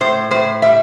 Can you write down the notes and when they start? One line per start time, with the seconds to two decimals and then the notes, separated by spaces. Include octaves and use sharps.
0.01 A2 C5
0.31 A2 C5
0.62 G3 E5